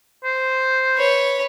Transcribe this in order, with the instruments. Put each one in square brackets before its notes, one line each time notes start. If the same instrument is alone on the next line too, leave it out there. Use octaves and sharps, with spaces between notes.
[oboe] C5
[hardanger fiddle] B4 C#5